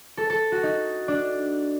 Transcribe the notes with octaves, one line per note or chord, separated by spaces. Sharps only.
A4
A4
F#4
D#4
D4